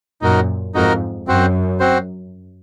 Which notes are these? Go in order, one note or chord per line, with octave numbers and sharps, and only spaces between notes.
F#2 A#2 D#4 F#4 A#4
F2 G#2 D#4 F#4 A#4
F#2 C4 F#4 C5
C4 F#4 C5